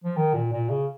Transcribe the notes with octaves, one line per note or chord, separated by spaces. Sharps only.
F3
D#3
A#2
A#2
C#3